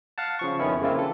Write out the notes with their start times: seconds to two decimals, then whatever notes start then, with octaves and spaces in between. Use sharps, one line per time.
0.18 F5 F#5 A5
0.39 C#3 F3 C#6
0.59 F2 D#3 B3 C#4 E4
0.81 C#3 G#3 A#3 C4 E4 F4
0.95 E3 A4